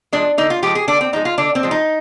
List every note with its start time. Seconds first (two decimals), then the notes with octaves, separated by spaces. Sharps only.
0.13 F3 G#3 D4
0.38 D3 D#4
0.50 F4
0.63 F3 G#3 G4
0.75 G#4
0.88 D3 D4
1.01 C4
1.13 F3 G#3 D#4
1.25 F4
1.38 D3 D4
1.55 C4
1.63 F3 G#3
1.71 D#4